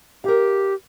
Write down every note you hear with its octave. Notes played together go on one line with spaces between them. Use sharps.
G4 A#4 F5